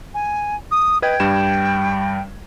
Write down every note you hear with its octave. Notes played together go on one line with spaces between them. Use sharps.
G#5
D#6
B4 D#5 G5 G#6
G2 G3 E7